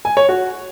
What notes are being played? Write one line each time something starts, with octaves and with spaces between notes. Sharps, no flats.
G#5
C#5
F#4